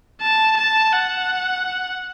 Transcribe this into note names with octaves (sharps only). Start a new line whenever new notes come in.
A5
A5
F#5